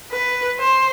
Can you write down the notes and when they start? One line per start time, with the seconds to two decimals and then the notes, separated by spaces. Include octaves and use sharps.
0.11 B4
0.59 C5